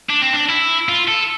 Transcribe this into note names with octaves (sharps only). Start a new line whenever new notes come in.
D4
C4
D4
E4
F4
A4